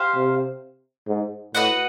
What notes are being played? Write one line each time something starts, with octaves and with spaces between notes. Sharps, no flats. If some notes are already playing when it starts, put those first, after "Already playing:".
Already playing: G4 C5 F5
C3
G#2
A2 F#4 B4 D#5 F#5